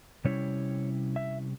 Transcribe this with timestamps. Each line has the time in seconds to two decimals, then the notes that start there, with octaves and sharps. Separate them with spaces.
0.25 C3 G3 C#4 E4 C#5
1.16 E5